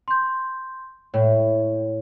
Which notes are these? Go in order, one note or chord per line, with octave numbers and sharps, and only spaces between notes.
C6 G6
A2 C#5